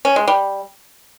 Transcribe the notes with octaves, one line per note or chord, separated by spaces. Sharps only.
C#4
G#3
G3